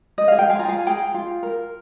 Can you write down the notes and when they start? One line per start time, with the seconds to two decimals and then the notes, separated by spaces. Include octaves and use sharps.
0.18 D#5
0.28 G#4 F5
0.39 G5
0.50 F5 G#5
0.59 F4 A#5
0.68 F5 G#5
0.87 G#4 G5 A#5
1.14 F4
1.43 A#4